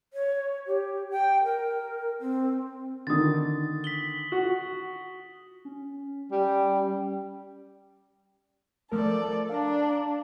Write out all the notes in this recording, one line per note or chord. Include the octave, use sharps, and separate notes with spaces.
C#5
G4
G5
A#4
C4
D3 D#3 D#6 A6
B6 F#7 G7
F#4
C#4
G3
F3 A3 A4 A#4 D5
D4 F5 A#5